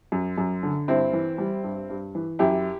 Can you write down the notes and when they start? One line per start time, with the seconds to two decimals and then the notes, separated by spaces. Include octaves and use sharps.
0.12 F#2
0.38 F#2
0.63 D3
0.88 G2 C4 E4
1.13 E3
1.38 G3
1.64 G2
1.90 G2
2.15 E3
2.39 F#2 E4 G4